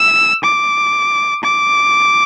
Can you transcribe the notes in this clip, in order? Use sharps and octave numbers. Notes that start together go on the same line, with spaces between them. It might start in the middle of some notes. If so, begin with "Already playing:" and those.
Already playing: E6
D6
D6